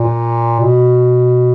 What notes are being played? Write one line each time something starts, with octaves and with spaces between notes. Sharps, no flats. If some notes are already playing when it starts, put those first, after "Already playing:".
Already playing: A#2
B2